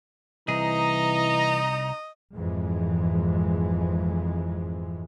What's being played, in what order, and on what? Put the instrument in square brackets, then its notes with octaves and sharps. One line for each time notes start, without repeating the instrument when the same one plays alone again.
[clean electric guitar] C2 G#4 [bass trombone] E3 [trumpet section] D#4 A#5 [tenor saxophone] D#5
[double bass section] G#1 F2 E3 G#3